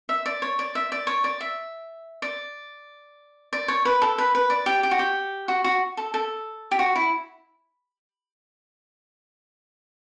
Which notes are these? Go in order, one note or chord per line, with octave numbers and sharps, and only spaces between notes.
E5
D5
C#5
D5
E5
D5
C#5
D5
E5
D5
D5
C#5
B4
A4
B4
B4
D5
G4
G4
F#4
G4
F#4
F#4
A4
A4
G4
F#4
E4